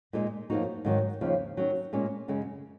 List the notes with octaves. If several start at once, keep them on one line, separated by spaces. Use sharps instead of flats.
A#2 G#3 D#4
F#2 F3 A#3 D#4 F#4
G#2 D#3 F#3
D#2 C#3 F3
D#3 F#3 C#4
A#2 G#3 C#4
F#2 C#3 G#3 C#4